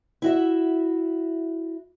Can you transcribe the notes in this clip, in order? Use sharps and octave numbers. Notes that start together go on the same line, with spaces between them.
E4 F#4 E5